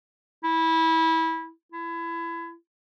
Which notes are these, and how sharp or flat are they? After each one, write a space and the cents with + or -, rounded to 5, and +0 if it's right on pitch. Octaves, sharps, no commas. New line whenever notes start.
E4 -20
E4 +25